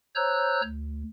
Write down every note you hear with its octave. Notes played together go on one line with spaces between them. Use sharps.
C5 C#5 A#5 E6 F#6 G6
D2